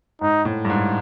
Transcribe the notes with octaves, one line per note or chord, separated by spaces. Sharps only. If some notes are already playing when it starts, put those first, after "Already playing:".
G#2 D#4
A2
G2
G#2